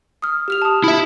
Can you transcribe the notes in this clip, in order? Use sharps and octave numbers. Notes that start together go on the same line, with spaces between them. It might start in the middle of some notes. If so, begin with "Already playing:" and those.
D#6 F6
G4 F6 F7
A5 D#6
E4 E5